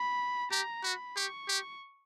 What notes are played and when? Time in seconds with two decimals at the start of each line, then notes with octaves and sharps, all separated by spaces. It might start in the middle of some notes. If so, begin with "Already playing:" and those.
Already playing: B5
0.51 G4 A#5
0.83 F#4 B5
1.16 G4 C#6
1.48 G4